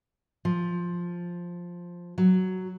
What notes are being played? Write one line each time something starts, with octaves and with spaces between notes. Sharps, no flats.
F3
F#3